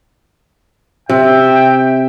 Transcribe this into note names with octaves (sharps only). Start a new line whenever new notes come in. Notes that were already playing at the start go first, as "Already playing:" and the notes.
C3 E5 G5